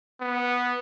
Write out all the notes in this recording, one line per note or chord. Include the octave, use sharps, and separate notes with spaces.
B3